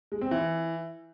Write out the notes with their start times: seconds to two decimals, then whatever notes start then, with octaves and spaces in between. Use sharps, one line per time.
0.12 G#3
0.21 C4
0.31 E3